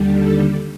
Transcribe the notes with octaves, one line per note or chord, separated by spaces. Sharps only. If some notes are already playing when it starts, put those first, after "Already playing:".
Already playing: D#2 D3 G3
A4